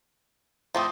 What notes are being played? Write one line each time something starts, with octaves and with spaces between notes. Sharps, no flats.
F3 A3 C4 C6 D6 D#6